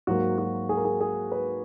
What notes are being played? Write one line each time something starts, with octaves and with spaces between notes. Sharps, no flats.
G#2 F#3 A#3 F#4
F#4
G#4
A#4
G#4
G#4
B4